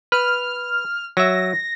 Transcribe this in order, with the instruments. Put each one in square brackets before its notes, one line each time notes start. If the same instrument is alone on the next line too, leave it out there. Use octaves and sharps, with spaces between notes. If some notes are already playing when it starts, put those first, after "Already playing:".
[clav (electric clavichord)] B4 [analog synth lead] F6
[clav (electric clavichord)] F#3 E5 [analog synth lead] A#6